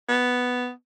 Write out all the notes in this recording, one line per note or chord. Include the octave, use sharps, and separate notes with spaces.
B3